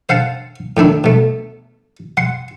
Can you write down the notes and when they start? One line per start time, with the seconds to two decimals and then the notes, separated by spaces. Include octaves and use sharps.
0.09 C5 F5 F#5 A5
0.77 A2 D#3 D4 E4
1.04 B2 A3
2.17 F#5 C6